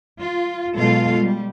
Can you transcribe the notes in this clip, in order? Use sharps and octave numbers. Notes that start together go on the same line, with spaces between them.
F4
B2 F#3 G#3 F4 A4 F5
G3